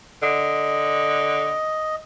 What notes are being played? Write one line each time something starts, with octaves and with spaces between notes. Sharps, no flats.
D3 D#5